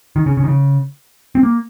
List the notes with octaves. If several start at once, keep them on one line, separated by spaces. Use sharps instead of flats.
D#3
C#3
C#3
D#3
C#3
C4
A#3